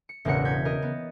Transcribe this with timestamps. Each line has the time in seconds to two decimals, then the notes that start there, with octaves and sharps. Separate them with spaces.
0.09 C#7
0.25 E1 A1 C#3 A#4 F#5 C#7
0.45 G6 G#6 B6
0.65 A#4 D#5
0.82 B3